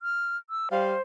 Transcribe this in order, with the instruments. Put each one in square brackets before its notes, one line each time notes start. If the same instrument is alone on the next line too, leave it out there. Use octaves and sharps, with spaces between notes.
[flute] F6
E6
[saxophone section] G3 F5 [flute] C5